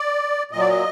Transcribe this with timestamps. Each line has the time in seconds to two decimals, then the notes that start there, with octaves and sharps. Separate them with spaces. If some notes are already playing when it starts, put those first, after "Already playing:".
Already playing: D5
0.51 A#2 D#5
0.56 F#3 D5
0.68 D#5